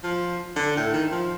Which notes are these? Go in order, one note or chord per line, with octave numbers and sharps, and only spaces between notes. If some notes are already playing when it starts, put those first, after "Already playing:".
F3
D3
A2
D#3
F3